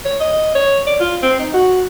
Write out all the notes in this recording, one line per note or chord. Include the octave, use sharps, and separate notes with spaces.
C#5
D#5
C#5
D5
F4
C4
D#4
F#4